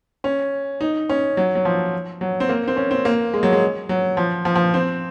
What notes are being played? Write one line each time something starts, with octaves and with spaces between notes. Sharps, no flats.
C#4
D#4
C#4
F#3
F#3
F3
F#3
C4
A#3
C4
C#4
C4
A#3
G#3
F#3
G#3
F#3
F3
F3
F3
C4